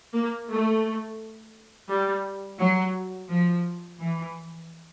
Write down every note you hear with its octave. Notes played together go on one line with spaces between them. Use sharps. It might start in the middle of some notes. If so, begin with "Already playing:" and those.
A#3
A3
G3
F#3
F3
E3